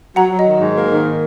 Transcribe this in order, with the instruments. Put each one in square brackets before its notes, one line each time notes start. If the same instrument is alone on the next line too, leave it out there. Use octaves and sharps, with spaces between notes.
[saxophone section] F#3 [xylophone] F#5 A#5
[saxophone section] F#3
[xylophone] D#5
[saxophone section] D#3
G#2
A#3
D#3